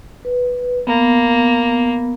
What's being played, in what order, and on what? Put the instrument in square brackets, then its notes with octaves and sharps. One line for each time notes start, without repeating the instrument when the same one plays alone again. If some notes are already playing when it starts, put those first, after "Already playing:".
[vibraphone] B4
[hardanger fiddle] A#3 [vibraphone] B3